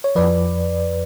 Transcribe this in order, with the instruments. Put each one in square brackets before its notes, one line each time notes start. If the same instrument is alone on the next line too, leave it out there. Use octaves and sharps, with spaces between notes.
[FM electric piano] C#5
F2 F3 B4 D5